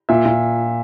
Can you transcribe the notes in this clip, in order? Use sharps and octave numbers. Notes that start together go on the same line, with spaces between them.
A#2 E5
A#2